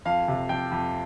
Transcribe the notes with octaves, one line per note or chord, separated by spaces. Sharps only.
F2 F5
C3
F2 G5
F2